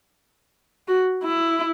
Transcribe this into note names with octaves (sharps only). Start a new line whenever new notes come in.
F#4
E4